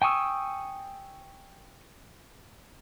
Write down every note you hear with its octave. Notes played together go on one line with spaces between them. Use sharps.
G5 G#5 C#6 D#6 E6